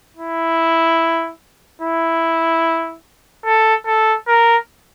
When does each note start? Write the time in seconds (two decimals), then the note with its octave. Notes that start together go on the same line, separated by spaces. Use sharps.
0.17 E4
1.81 E4
3.46 A4
3.87 A4
4.28 A#4